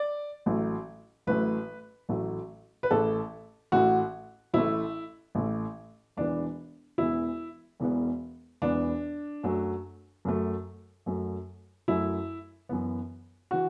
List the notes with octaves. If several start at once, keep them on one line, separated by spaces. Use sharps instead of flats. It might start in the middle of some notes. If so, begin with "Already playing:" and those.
Already playing: D5
A1 A2 F#3 A3
A1 A2 F#3 A3 B4
A1 A2 F#3 A3
B4
A1 A2 A3 A4
A1 A2 A3 F#4
A1 A2 A3 E4
A1 A2 A3
E1 E2 E3 B3 D4
E1 E2 E3 B3 E4
E1 E2 E3 B3
E1 E2 E3 B3 D4
F#2 F#3 A3
F#2 F#3 A3
F#2 F#3 A3
F#2 F#3 A3 E4
F#2 E3 B3
E3 F#4